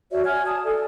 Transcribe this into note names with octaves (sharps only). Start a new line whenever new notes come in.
F#4 C#5 D5 E5
G#5 F6 G#6
A5 D#6
A4 D5